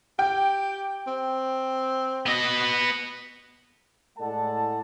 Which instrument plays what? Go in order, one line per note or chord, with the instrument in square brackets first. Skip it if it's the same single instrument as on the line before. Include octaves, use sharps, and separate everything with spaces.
[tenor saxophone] G4 [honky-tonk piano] G5
[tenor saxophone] C4
[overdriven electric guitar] B3 D#5
[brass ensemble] A2 G#3 A4 D5 F#5 A5